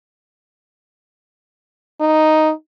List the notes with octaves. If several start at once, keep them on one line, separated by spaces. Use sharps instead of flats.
D#4